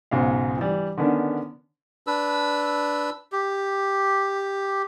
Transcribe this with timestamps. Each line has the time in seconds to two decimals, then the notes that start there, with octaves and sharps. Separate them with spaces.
0.11 B1 G#2 C#3 F5
0.58 E3 G3
0.97 D3 D#3 B3 C#4 D4
2.07 D4 B4 E6
3.32 G4